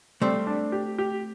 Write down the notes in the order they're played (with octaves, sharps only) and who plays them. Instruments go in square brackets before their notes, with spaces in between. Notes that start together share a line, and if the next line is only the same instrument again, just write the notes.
[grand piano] G3 [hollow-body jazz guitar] A3 C4
[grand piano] D4
G4
G4